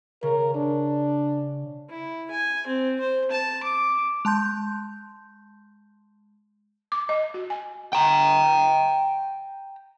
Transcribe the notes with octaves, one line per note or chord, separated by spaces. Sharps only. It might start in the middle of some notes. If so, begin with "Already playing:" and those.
C#3 A#4
D4
E4
G#5
C4
C5
A5
D6
G#3 A5 C6 G6
D6
D#5
F#4
G#5
G5 A#5